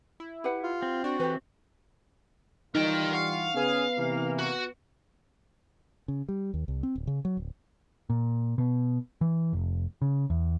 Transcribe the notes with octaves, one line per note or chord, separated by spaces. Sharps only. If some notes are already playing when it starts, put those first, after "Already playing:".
E4
G4 B4 F#5
F4
C4
D4 F#4
E3 G4 A4 B4
E3 G3 D#4 F4 A#4 G5
F5 F#5 C#6 C#7
C#3 B3 G#4 B4
C3 E3 A#3
F#4
C#3
G3
D#2
C2
C4
D1
C#3
F#3
D1
A#2
B2
E3
F1
C#3
E2